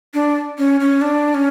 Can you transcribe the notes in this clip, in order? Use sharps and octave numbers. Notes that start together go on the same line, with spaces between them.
D4
C#4
C#4
D4
C#4